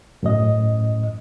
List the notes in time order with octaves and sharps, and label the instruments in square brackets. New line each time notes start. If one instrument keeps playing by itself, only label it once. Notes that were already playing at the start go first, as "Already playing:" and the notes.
[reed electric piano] F#2 A2 D#5